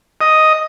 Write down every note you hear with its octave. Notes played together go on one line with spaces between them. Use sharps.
D#5